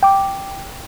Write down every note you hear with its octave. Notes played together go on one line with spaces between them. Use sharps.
G5 D6